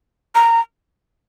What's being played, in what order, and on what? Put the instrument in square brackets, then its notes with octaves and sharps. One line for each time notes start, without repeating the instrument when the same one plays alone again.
[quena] A#5